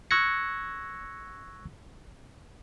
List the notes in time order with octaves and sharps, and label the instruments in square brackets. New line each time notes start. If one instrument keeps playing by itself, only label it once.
[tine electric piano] C#6 E6 F#6 G#6 A#6 C#7